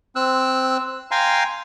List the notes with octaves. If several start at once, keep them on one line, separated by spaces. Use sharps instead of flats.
C4 E6 F#6
F5 G5 G#5 A#5 C6